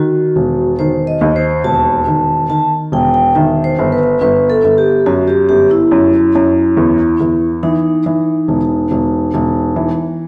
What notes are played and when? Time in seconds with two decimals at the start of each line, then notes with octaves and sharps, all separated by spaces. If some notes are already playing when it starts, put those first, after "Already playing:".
Already playing: D#3 F#4
0.36 E1
0.79 D#3 C5
1.07 D#5
1.21 D#2
1.36 C5
1.64 E1 A5
2.07 D#3
2.49 D#3 A5
2.92 E1 G5
3.14 G5
3.35 D#3 E5
3.64 C5
3.79 G1
3.92 B4
4.21 G1 B4
4.50 A4
4.64 G1
4.78 G4
5.06 F#2 F#4
5.28 G4
5.49 G1 G4
5.71 E4
5.92 F#2
6.35 F#2
6.77 E2
7.20 E2
7.63 E3 D#4
8.06 E3
8.48 E1
8.91 E1
9.34 E1
9.76 E3